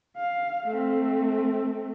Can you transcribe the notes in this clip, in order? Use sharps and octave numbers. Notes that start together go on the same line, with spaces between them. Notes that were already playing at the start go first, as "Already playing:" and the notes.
F5
A3 C4